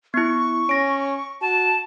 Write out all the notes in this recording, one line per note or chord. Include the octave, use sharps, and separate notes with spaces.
B3 E4 C#6
C#4 A#6 D7
F#4 A5